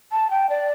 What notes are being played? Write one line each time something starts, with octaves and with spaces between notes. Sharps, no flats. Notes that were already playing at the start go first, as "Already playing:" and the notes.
A5
G5
D5